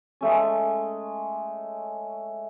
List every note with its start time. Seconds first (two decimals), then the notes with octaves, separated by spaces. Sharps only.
0.21 G#3 A3 C#4